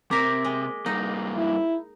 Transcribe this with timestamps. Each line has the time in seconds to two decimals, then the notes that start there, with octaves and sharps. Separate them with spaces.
0.11 C3 A#3 A#4 D6 B6
0.45 G#3
0.86 G2 A#3 D#4
1.37 E4